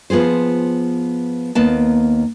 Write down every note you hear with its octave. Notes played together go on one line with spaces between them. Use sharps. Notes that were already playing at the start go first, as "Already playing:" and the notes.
F3 B3 F4 G#4 C5
D#2 A#3 B3 A5